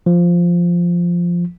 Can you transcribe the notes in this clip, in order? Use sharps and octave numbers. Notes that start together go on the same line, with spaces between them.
F3